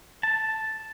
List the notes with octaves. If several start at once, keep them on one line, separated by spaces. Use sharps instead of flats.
A5